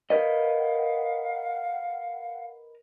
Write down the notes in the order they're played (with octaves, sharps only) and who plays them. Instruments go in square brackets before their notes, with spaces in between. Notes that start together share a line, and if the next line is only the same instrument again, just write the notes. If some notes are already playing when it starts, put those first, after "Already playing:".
[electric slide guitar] A#4 B4 D#5 [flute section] F5 F#5